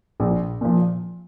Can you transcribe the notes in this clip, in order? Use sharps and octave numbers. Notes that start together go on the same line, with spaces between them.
A#1
A#2 F3